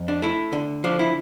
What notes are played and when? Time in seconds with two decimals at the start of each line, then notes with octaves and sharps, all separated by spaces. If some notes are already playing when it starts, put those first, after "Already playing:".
Already playing: F2
0.08 D4
0.22 A3 E4
0.53 D3
0.84 F3 D4
0.99 E4